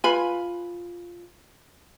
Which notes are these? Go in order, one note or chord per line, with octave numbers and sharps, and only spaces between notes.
F4 B4 G#5 B5